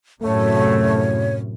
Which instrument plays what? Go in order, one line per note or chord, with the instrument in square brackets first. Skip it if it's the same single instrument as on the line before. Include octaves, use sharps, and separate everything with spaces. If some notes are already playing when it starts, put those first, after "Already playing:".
[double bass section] F#2 A2 C3 [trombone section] A3 [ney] C#5